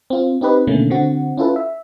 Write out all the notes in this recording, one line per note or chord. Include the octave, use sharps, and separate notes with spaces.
C4 F4
C4 D#4 G4 B4 D#5
B2 D3 D#3 A3 A#3 C#4
D3 C4 F#4
C#4 E4 F4 A4 B4
E5